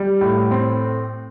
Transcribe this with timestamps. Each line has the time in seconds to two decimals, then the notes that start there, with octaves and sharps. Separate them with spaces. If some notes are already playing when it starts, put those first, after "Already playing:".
Already playing: G3
0.21 A2
0.51 C4